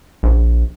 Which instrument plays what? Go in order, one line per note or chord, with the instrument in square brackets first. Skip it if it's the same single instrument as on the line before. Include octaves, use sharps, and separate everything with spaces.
[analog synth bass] A#1